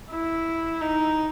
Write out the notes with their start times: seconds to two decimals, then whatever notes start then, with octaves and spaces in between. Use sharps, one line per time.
0.11 E4
0.81 D#4